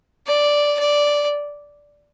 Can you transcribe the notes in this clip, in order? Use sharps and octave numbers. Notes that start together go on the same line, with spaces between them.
D5
D5